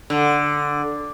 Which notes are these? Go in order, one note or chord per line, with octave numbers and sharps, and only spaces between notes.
D3